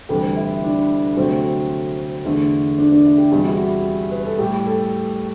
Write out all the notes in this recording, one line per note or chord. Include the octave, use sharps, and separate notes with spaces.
D2 C3 E3 G3 G4
E4
D4
D2 C3 F#3 A3 C4
E2 D3 A3
D4
D4
E4
G4
E2 C3 G3 G4
F#4
E4
F#4
B4
A4
A2 G3 G4
A4